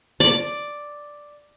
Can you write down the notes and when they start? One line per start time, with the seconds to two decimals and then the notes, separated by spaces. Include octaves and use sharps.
0.20 D5